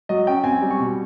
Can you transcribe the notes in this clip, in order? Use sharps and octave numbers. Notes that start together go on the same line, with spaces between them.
F#3 D#5
C#4 G5
C4 G#5
G3
C#6
B2